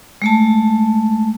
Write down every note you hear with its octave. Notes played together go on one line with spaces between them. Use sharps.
G#3 A3 A5